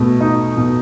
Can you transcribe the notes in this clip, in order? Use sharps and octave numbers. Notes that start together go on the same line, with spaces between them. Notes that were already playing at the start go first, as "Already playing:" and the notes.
Already playing: B2 A3
D#4
B2